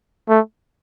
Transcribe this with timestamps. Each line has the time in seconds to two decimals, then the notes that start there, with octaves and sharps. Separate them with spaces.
0.29 A3